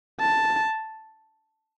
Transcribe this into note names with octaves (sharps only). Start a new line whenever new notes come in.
A5